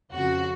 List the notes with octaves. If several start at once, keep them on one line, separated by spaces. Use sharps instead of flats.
F2 C#3 F3 F#4